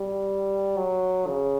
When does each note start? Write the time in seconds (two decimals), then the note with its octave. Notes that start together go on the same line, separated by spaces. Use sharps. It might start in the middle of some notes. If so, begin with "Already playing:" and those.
Already playing: G3
0.77 F#3
1.28 C#3